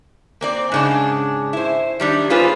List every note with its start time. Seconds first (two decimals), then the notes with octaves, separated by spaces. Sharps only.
0.41 A#3 C4 D5
0.72 G#2 C#3 D4
1.53 E4 C5
2.00 D#3 G3 D4
2.30 A#3 C#4 F4 G#4 B4 C5